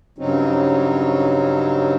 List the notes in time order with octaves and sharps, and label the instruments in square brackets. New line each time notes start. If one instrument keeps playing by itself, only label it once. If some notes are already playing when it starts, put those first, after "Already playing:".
[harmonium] G2 C#3 F#3 C4 C#4 D#4